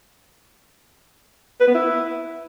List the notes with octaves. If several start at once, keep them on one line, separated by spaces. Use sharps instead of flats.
B4
B3
E4